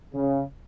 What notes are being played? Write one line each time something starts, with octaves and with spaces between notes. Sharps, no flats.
C#3